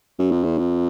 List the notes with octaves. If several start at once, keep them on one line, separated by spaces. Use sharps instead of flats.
F#2
F2
E2
F2